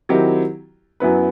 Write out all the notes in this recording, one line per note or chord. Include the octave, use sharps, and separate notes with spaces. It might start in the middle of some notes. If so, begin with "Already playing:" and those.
D#3 F#3 C4 E4 G4
F#2 F#3 B3 E4 B4